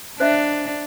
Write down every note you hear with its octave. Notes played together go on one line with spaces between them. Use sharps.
D4 C5 D#5 E5